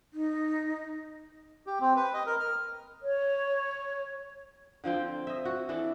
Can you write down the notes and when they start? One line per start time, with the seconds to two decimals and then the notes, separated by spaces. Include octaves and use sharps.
0.13 D#4
1.67 G4
1.81 C4
1.96 B4
2.14 D#5
2.26 A#4
2.40 F6
3.03 C#5
4.84 D3 F3 C4 G5
5.27 D#5 E5
5.45 F#4
5.69 E3 D4 A4